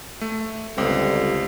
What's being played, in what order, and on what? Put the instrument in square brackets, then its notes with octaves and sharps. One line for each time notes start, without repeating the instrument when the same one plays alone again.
[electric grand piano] A3
[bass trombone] G1 [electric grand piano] C#2 C4